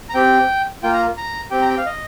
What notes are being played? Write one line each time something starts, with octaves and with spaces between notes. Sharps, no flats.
A#5
C4 G4 G5
A#3 F4 G5
A#5
A#5
C4 G4 G5
A#5
G5
F5
D#5